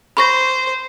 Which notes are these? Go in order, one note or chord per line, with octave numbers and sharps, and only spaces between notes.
C5 B5 C#6 A#6